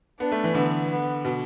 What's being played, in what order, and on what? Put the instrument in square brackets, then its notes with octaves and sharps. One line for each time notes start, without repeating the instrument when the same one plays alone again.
[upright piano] B3 [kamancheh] D4
[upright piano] A3
E3
[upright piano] D3 [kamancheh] B3
[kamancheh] B3
[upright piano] B2